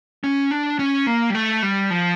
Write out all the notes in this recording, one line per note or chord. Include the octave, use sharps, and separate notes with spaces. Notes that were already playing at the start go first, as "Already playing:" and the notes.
C#4
D4
C#4
A#3
G3
A3
G3
F3